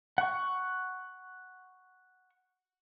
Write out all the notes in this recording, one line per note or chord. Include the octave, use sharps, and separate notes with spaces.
F#5 C#6